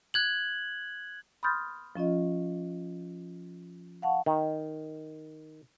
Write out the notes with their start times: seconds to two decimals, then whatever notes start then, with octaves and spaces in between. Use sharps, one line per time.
0.14 F#6 G#6 F#7
1.43 B5 C6 D#6 F6 G6 A6
1.96 F3 C#4 F4 D#5
4.02 F5 F#5 A5 C#6
4.26 D#3